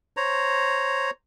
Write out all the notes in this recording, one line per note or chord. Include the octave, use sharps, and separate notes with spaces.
C5 C#5 A#5